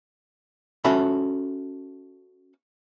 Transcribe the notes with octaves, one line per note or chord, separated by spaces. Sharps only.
C#4 F#4 A4 E5 B5